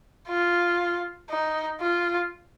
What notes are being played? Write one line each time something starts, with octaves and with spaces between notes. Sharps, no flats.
F4
D#4
F4